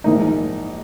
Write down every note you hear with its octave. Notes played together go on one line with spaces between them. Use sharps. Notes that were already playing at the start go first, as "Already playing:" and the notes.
A#1 G#2 E3 A#3 D#4